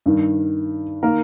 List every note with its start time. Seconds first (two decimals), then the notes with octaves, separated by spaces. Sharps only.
0.06 G2 D#3
1.03 D#3 A#3 A#4